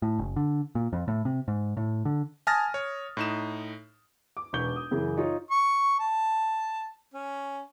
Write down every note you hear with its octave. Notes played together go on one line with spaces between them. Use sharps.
A2
F#1
D3
A#2
F2
A2
C3
G#2
A2
D3
G#5 A5 D#6 F6 A6 A#6
C#5
A2 D#4 E7
D6
E1 B1 B4 C#6 G6 G7
D#6
F#2 C#3 E3
D#4 F4 C#5
C#6
A5
C#4